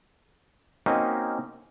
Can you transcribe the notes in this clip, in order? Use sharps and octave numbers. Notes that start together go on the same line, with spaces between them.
A#3 C4 C#4 D#4 F#4 D#5